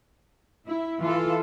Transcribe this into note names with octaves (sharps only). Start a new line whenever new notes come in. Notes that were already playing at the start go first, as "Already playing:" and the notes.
E4
E3 F4 A4